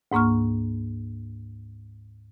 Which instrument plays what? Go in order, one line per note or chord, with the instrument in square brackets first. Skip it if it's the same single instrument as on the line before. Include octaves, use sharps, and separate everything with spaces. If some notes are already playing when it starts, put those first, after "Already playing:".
[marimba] D2 G#2 A#3 C#6 F6